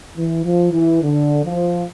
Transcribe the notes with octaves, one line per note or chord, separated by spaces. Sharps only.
E3
F3
E3
D3
F3